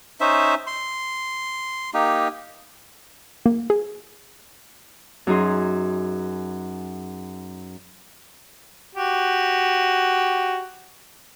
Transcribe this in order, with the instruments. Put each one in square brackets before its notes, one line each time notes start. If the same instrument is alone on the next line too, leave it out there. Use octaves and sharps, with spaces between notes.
[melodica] C#4 D#4 C5 E5
C6
A#3 D#4 G4
[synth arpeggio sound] A#3
G#4
[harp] F#2 D#4 G#4 C6
[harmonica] F#4 G4